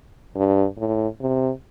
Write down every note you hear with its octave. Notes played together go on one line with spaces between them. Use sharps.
G2
A2
C3